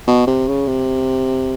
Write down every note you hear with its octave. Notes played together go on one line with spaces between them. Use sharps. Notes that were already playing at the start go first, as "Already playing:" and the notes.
B2
C3
C#3
C3